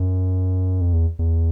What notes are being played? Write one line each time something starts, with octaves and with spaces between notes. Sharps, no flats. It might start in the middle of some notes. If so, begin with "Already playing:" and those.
Already playing: F#2
F2
E2
E2